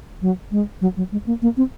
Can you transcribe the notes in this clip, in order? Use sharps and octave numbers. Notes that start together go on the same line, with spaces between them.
F#3
G#3
F#3
F#3
G#3
A#3
A#3
C4